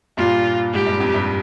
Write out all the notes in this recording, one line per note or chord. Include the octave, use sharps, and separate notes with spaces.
G2 A#2 F4
G#2 G4
G2
F2
G2